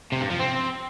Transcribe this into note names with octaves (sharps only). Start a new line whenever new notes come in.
C3
G2
F3
C4